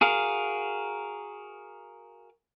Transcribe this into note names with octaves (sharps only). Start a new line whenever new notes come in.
F#4 G#4 A#4 F5